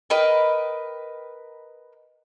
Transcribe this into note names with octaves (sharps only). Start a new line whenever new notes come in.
A#4 B4 D#5 G5